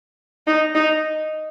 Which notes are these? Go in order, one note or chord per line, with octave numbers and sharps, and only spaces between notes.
D#4
D#4